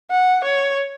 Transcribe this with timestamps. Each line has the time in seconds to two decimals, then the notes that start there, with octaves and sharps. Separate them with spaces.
0.11 F#5
0.44 C#5